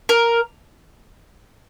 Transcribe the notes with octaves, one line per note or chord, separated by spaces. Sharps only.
A#4